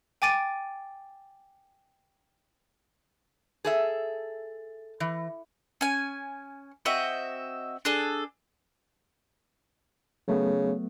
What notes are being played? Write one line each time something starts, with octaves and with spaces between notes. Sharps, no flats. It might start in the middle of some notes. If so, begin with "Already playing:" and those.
G5 G#5 D6 A6 D7 D#7
G#4 A4 E5
E3
C#4 G#5
C4 F#4 D#5 E5
D4 G#4 A4
C#3 F#3 A3 B3